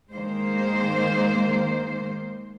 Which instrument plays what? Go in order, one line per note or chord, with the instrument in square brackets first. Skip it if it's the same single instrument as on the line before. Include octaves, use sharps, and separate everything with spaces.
[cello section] D#3 G#3 A#3 C5